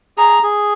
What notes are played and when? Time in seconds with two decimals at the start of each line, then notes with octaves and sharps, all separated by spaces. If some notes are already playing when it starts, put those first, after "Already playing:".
0.18 G#4 A#5
0.43 G#4